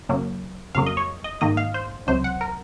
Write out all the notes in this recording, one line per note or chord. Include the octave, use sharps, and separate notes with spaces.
F#2 C#3 F#3 A#3
F2 C#3 F#3 A#3 F5
D#5
C#5
D#5
G#2 D#3 A#3 D#5
F5
C5
C#2 C3 F#3 C5
F#5
A#4